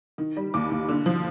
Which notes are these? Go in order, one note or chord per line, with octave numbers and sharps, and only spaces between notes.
D#3
G3
D#2 D6
D#2
D3
F3